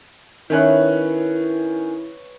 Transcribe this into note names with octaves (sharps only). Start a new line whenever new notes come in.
D#3 C#4 E4 B4 C#5 E5 F#6